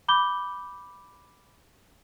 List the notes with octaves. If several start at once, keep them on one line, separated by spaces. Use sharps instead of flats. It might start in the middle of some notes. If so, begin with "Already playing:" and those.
B5 D6 G6 G7